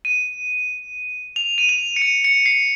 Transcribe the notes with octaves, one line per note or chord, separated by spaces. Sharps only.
D#7
F7
D#7
F7
C#7
D#7
C#7
C7